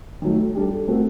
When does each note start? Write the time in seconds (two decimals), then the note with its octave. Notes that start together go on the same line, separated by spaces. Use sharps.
0.22 D#3 F#3 A3
0.55 G3 D4 A4
0.87 A3 C4 F#4 A#4